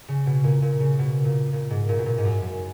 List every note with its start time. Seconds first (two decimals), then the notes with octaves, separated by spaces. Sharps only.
0.08 C#3
0.26 B2
0.44 A#2
0.62 A#2
0.80 C#3
0.99 B2
1.25 A#2
1.52 A#2
1.70 G#2
1.89 A#2
1.98 B2
2.06 A#2
2.18 G#2
2.25 F#2
2.42 F#2